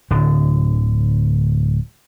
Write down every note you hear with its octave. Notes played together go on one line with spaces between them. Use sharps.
D1 D3